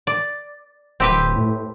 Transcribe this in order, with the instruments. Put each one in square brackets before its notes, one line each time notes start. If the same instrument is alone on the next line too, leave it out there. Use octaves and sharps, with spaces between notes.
[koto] D5
[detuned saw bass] D1 [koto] C4 G4 B4
[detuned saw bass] A2